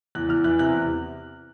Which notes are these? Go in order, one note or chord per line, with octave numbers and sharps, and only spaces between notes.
E2 F#6
E2 F6
E3 F#6
C3 F#6
E2